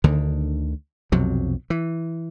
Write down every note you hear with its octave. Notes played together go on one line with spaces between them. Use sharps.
D2 D3 D#3
B1 F2 C3 F#3
E3